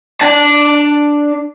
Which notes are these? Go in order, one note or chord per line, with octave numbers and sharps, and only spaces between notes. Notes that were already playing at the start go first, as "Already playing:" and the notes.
D4 A5